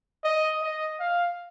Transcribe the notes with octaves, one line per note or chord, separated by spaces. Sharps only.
D#5
D#5
F5